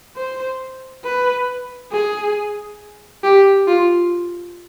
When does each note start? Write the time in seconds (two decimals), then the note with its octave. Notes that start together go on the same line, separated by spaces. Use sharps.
0.16 C5
1.05 B4
1.92 G#4
3.24 G4
3.68 F4